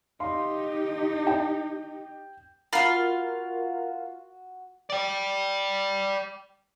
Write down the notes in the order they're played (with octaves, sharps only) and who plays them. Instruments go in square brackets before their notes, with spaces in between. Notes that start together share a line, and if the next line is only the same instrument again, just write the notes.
[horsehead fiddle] D#4 G4 [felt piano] F5 C6
[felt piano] G5
[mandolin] F4 F5 [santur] F#4 [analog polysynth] A#4 [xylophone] B5 F6 C7
[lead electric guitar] D5 G5